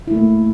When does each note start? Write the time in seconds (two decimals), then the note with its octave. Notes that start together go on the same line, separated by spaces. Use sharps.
0.08 E4
0.11 A3
0.15 A#3